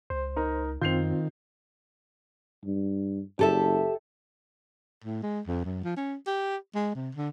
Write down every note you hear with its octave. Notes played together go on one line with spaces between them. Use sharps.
C#2 C5
D#4 A#4
F#2 D#3 C4 F4 G6 C7 F7
G2
F#1 G4 A4 E5
A2
G#3
F2
F#2
F3
C#4
G4
G#3
C3
D3